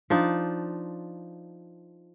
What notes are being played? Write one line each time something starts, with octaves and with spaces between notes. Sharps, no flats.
F3 D4 D#4